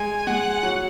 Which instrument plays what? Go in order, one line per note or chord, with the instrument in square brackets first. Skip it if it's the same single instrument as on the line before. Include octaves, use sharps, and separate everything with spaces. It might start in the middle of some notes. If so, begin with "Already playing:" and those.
Already playing: [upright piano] G#3 [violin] G#5
[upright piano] G#3 [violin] F#5
[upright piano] F#3